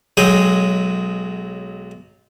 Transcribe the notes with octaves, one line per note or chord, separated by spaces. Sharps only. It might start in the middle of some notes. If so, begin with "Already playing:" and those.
B1 F#3 G#3 G#4 G5